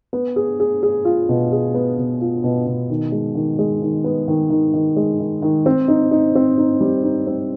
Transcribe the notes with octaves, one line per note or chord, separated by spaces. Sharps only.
B3
G#4
G#4
G#4
F4
B2
G#4
B3
B2
F4
B2
B2
D#3
G#3
D#3
G#3
D#3
B3
D#3
D#3
D#3
G#3
D#3
D#3
C4
D#4
D#4
C4
D#4
G3
D#4
C4